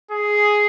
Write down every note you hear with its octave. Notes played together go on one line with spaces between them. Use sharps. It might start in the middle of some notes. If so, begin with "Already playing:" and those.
G#4